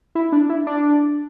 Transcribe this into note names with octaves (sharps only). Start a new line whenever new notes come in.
E4
D4
E4
D4